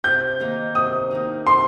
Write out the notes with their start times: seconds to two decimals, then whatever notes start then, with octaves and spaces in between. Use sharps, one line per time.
0.04 C3 G6
0.40 D#3 A#3 D#4
0.75 C3 D#6
1.11 D#3 A#3 D#4
1.46 C3 C6